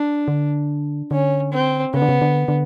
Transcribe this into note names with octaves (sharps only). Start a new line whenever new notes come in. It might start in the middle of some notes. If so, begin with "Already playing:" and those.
Already playing: D4
D3
D3 C#4
C4
C#3 B3
D3
C#3
D3
D3